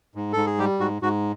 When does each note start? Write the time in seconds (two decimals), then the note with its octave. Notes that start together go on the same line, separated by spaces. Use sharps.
0.15 G#2
0.33 G#2 A4
0.46 G#4
0.59 G3 G4
0.80 G#2 F#4
1.02 G#2 F#4